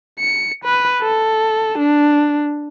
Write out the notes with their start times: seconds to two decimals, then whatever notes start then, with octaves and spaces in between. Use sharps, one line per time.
0.19 C#7
0.64 B4
1.02 A4
1.78 D4